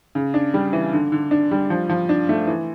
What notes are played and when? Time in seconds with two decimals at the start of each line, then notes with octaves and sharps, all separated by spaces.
0.15 C#3
0.34 D4
0.54 G3
0.73 E3
0.93 D3
1.12 D3
1.31 D4
1.51 G3
1.70 F3
1.89 F3
2.09 D4
2.29 A3
2.47 E3